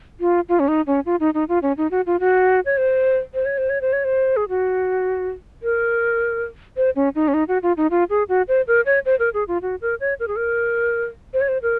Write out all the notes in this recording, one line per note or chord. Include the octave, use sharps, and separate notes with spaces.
F4
F4
C#4
D#4
C#4
F4
D#4
D#4
F4
C#4
D#4
F#4
F4
F#4
C#5
C5
C5
C#5
C5
C#5
C5
C#5
C5
G#4
F#4
A#4
C5
C#4
D#4
C#4
D#4
F#4
F4
D#4
F4
G#4
F#4
C5
A#4
C#5
C5
A#4
G#4
F4
F#4
A#4
C#5
A#4
G#4
A#4
C5
C#5
C5
A#4